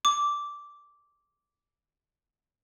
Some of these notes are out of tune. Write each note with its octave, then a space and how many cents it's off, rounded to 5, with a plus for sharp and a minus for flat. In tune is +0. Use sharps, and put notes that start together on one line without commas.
D6 -10